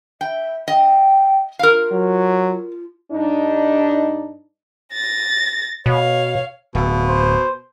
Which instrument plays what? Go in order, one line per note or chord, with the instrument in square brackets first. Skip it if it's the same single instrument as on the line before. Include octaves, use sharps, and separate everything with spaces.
[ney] E5 [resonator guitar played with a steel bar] G5
[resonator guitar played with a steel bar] D#5 [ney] G5
[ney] F4 [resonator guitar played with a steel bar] A#4 F5
[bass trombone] F#3
[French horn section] G2 D4 D#4
[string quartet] A6 A#6
[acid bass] B2 [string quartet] C#5 F5
[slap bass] D1 [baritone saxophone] B2
[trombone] C5